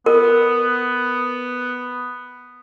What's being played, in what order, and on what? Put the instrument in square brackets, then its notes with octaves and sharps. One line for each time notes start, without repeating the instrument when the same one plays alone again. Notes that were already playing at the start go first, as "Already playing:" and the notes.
[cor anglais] B3 [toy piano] A#4